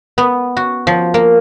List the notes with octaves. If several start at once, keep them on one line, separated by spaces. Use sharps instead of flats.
B3
F#4
F3
A#3